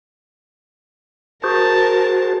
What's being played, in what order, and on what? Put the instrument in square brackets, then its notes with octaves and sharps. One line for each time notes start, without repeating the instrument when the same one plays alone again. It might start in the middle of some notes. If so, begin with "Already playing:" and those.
[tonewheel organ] F#4 G#4 C5 [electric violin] A#4 A5